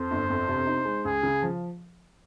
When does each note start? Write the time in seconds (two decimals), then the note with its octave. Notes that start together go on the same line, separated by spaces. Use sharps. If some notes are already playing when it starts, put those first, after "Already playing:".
Already playing: F2 C5
0.11 G1
0.30 F2
0.48 C3
0.67 D#4
0.85 G#3
1.04 C#2 G#4
1.23 C#3
1.42 F3